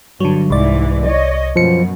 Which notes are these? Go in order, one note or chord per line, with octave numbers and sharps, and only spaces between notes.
G2 D3 F#3
C2 G#2 E3 D5
C#5 D#5
F#2 B2 F3 C#7